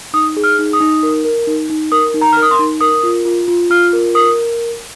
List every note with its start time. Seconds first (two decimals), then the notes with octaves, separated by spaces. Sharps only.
0.14 D#4 D#6
0.37 G#4
0.44 F6
0.59 D#4
0.73 D#6
0.81 D#4
1.03 A#4
1.25 A#4
1.47 D#4
1.70 D#4
1.92 A#4 D#6
2.14 D#4
2.21 A#5
2.33 A#4 F6
2.42 D#6
2.51 C6
2.59 D#4
2.81 A#4 D#6
3.03 F4
3.25 F4
3.48 F4
3.70 F4 F6
3.93 A#4
4.15 A#4 D#6